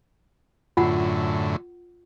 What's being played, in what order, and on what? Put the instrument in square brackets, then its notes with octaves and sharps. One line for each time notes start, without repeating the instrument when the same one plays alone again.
[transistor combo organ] F#2 A2 D3 [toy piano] F4 F#5